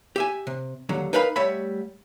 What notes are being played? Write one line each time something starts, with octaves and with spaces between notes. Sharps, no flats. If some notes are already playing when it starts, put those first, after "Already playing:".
G4 E5 G#5
C3
D#2 D3 F#3
D#4 A#4 B4 F5 G#5 B5
G3 A3 C#5 E5 F#5 B5